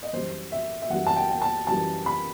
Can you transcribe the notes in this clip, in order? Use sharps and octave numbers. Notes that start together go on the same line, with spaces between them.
D#5
F#2 E3 G3 C5
E5
E5
F#2 E3 G3 F#5
A5
G5
G5
A5
F#2 E3 G3 A5
B5